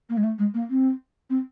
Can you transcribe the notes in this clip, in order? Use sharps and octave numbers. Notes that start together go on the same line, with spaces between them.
A#3
G#3
A3
G#3
A#3
C4
C4